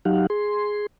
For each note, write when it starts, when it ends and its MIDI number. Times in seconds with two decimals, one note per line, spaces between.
0.05 0.27 54
0.05 0.27 63
0.05 0.27 67
0.05 0.27 77
0.05 0.27 78
0.30 0.86 68
0.30 0.86 84